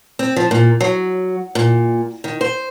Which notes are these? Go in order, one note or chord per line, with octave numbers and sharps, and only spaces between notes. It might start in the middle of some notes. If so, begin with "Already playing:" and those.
C4
F3
A#2
F#3
A#2
D#3
C5